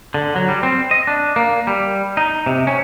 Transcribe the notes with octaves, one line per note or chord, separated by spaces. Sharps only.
D3
F#3
G3
C4
D#5
D4
A#3
G3
D#4
C3
C#4